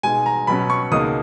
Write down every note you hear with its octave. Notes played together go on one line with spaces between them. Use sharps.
B2 G#3 D#4 G#5
A#5
B2 F#3 C#4 B5
C#6
C#2 B2 A#3 D#4 D#6